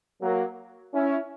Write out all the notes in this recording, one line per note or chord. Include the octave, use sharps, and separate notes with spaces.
F#3 A#3
C#4 E4